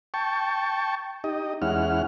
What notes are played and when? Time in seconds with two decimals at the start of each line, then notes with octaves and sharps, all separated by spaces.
0.14 G5 A5 C#6
1.24 D#4 G4 D#5
1.62 E2 G#3 C#4 E4 F#5 F6